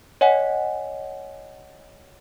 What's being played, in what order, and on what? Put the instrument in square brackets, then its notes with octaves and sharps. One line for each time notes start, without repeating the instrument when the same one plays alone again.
[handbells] C#5 D#5 F#5 G#5